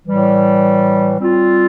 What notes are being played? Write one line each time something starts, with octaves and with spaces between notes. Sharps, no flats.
A2 E3 G3
G3 C4 F4